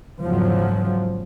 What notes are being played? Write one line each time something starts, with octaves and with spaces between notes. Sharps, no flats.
E2 G#2 C#3 F3 F#3